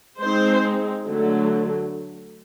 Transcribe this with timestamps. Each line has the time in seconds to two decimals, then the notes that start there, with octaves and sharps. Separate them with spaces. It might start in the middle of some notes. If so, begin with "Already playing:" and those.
0.20 G#3 C4 D#4 C5
1.04 D3 F#3 A3